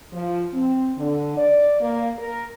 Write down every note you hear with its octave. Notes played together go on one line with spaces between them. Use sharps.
F3
C4
D3
D5
A#3
A#4